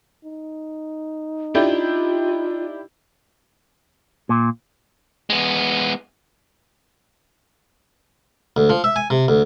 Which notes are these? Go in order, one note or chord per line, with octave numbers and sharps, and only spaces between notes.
D#4
D4 E4 F4 G4
A#2
G#3 B3
D2
F3
E5
G#5
C3
D2